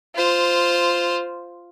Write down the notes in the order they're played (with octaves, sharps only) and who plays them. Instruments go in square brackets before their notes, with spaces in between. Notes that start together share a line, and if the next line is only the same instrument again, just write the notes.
[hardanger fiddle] F4 C5